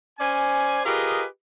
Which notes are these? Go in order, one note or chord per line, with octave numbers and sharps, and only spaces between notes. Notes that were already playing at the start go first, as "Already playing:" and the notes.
C#4 C5 D5 G#5
F4 G4 G#4 A#4 B4 D#5